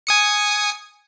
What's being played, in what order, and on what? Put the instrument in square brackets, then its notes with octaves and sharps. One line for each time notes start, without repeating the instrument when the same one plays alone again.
[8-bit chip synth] G#5 D#6 C#7